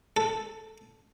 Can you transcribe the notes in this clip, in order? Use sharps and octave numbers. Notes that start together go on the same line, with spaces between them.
A4